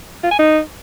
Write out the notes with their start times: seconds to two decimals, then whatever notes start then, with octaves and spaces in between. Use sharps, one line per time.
0.23 F4
0.31 G#5
0.39 D#4